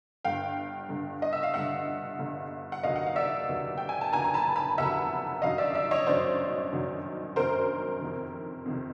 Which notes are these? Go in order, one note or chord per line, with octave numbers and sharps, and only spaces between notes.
G1 G2 D3 F5 G5
G1 G2 D3
D#5
E5
F5
G1 G2 D3 E5 F#5
G1 G2 D3
F#5
F1 D#2 D3 F#3 D#5 F5
F#5
F5
D5 E5
F1 D#2 D3 F#3
G5
G#5
A5
F1 D#2 D3 F#3 G#5 A#5
A#5
A5 B5
A5 B5
F1 D#2 D3 F#3 E5 F#5
G1 F#2 D#3 F#3 D#5 F5
D5 E5
D5 E5
C#5 D#5
G1 F#2 D#3 F#3 C5 D5
G1 F#2 D#3 F#3
G1 F#2 D#3 F#3 A#4 C5
F2 C3 D#3
F2 C3 D#3